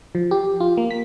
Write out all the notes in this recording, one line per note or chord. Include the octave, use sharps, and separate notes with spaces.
F3
G4
F4
A#3
B6